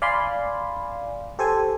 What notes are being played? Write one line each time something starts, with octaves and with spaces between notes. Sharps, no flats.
D5 F5 G#5 B5 C6
G4 A4 C5 G#5